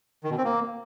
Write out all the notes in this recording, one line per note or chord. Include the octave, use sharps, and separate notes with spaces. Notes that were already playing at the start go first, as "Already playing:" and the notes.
D#3
B2
C4
A#3